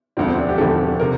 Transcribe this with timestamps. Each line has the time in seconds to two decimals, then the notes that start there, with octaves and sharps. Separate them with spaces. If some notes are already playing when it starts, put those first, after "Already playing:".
0.17 E1 D2 D3 F3 C4
0.28 C4
0.38 D4
0.49 G4
0.58 E1 D2 D3 F3 A4
1.00 C3 A#4